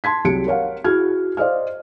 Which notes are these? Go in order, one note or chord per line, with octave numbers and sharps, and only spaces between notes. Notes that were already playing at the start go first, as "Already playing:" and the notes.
A5 C6 G#6 B6
C2 F#3 G4 G#4 C#7 D7
A#4 C#5 F5 F#5
E4 F#4 G#4 F6 G#6
C5 D5 D#5 F5 F6